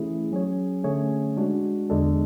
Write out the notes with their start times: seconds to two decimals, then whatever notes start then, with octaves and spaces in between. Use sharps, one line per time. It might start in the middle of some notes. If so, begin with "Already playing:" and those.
Already playing: E3 A3 C#4 E4 G#4
0.32 F#3 C#4 G#4 C#5
0.84 D3 A3 C#4 G#4 C#5
1.37 G#3 D4 F#4
1.90 E2 D3 G#3 D4 A4